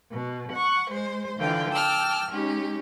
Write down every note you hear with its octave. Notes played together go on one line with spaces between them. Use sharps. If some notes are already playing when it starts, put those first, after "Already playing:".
B2
F#5 C#6
G#3 C5
D3 E3 F4 F5 G5
G5 A5 D6 E6 F6
G#3 C#4 D#4 G4